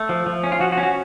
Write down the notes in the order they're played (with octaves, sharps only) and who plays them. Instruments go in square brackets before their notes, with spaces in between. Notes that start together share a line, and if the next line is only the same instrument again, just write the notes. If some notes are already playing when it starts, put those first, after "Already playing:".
Already playing: [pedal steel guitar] A3
F3
F3
C#4
F4
F3 F#4
F#4
C#4
F#4